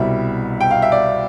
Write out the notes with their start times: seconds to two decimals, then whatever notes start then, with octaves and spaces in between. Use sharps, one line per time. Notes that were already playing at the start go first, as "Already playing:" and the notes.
Already playing: C2 B2 G3 E5
0.61 G5
0.71 F5
0.82 E5
0.92 D5